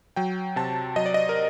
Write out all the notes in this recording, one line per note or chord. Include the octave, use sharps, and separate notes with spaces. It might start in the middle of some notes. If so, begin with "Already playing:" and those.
F#3 G5
C3 A5
F#3 D#5
D5
D#5
A#4